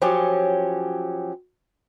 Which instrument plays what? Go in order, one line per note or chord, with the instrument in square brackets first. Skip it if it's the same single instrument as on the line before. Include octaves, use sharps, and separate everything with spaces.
[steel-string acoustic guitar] F3 F#3 C#4 G4